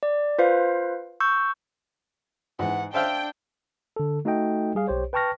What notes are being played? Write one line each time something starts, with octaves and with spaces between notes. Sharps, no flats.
D5
F4 B4 C5 F5
C#6 E6 G6
G#2 E3 F#5
D4 C5 E5 F5 G5
D3 A4
A3 D#4 F#4 A4 D#5 G5
G3 G#4 F5
B1 G4 C5 C#5
B4 G5 A5 C#6 F6 A#6